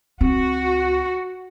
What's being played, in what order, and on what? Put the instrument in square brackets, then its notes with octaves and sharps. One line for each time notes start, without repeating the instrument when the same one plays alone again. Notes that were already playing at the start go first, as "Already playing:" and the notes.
[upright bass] C#2 C4 [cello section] F#4